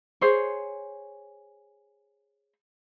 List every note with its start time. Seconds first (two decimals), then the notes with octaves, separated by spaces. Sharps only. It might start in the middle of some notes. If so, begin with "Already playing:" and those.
0.21 G#4 C5 C#5